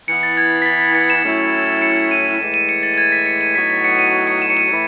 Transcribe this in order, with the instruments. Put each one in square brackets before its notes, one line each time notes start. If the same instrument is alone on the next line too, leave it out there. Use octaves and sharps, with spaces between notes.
[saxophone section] E3 B3 E4 [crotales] C#7
[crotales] A6
G#6
B6
A6
A6
C#7
E7
[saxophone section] A2 F#3 C#4 E4
[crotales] C#7
D#7
[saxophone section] A2 E3 G#3
[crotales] D#7
C#7
A6
A6
G#6
B6
C#7
D#7
[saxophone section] A2 F#3 B3 D#4 F#4 [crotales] B6
[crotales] B6
C#7
D#7
C#7
E7
C#7
D#7
[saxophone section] A2 E3